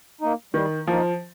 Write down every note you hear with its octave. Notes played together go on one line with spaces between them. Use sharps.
A#3 D#4
D#3 G3
F3 A#3 D#4